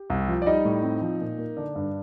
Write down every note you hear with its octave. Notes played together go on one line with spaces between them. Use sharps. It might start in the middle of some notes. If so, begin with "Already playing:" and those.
Already playing: G4
C2
F3
D5
G3 D#4 D#5
A2
C4
F3
A#2
A#3
D3 D4 D5
G2